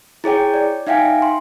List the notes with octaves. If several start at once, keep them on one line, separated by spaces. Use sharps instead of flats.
E4 G#4 C#5 G5
D5
D#4 E5 F5 G5 G#5
C6